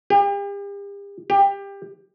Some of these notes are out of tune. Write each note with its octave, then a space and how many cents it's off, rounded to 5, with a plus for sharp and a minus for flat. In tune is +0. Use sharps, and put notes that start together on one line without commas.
G4 +40
G4 +20